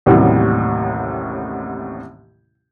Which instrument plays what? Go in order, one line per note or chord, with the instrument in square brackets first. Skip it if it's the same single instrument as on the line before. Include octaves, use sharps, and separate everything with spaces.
[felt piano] A1 D#2 A2 C3 F#3 G3